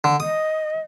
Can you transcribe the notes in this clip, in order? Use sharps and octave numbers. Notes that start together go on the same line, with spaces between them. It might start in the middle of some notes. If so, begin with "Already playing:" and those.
D3
D#5 D#6